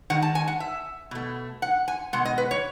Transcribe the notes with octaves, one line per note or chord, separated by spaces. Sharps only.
D#3 G#3 F#5
A5
G#5
F#5
E5
B2 A3
F#5
G#5
B2 G#3 F#5
D#5
B4
C#5